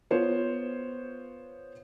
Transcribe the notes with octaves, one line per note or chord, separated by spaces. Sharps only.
B3 F4 C5 C#5